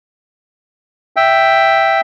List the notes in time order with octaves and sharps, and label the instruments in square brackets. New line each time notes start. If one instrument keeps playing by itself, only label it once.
[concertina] E5 G5